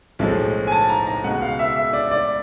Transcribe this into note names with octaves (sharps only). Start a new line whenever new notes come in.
B1 A2 F3 G#3
G#5
A5
A#5
A#5
C#2 B2 G#3 F#5
F5
E5
E5
D5
D5